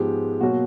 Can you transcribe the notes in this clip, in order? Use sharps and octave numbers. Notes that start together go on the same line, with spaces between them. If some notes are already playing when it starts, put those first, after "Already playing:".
Already playing: G#2 F3 G#3 B3 G4
B2 F#3 A#3 F#4